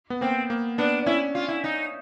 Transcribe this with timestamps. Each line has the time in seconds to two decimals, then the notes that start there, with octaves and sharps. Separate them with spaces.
0.10 B3
0.21 A#3 C4
0.50 A#3
0.78 B3 D4
1.06 C#4 E4
1.35 F4
1.48 E4
1.64 D#4